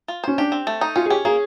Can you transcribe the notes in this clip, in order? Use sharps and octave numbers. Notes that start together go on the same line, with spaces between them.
F4
C#4 C5
D4 G4
C4
A3
D#4
C#4 F4
G#4
C#4 G4
A#3 G#4